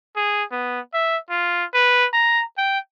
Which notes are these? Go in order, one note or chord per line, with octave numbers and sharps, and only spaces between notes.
G#4
B3
E5
F4
B4
A#5
G5